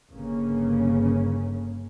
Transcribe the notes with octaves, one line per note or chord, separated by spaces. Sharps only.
G1 C#3 A#3 C#4